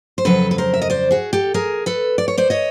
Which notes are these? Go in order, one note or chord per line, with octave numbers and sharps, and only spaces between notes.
C5
F2 C#3 F#3 A4 B4
B4
A#4 C5
E5
D#5
C5 D5
F#4 G#4
G4 A4
G#4 A#4
A4 B4
D5
C#5
C5 D5
C#5 D#5